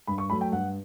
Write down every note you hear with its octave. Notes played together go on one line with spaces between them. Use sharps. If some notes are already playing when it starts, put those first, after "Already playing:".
G2 B5
C#6
F#3 A3 B5
G5
G2 F#5